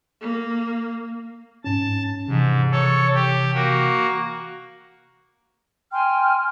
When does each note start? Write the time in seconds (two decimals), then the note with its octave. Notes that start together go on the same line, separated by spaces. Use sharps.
0.21 A#3
1.64 G#2 C#4 A5
2.28 G#2 C3 E3
2.72 A4 C#5
3.14 G4
3.54 A#3 F#4
5.92 G5 G#5 C6 F6